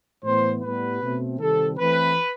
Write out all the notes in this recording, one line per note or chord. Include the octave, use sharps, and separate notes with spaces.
A2 E3 B3 C5
A2 G3 B3 B4
B2 A3 C4
C3 D#3 G3 C4 A4
E3 A3 C4 B4